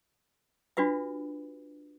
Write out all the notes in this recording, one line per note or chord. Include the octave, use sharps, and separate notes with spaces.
D4 F4 F#4 B4 E5